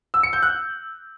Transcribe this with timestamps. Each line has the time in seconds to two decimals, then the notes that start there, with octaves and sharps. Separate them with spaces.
0.14 E6
0.23 C#7
0.33 G6
0.43 F#6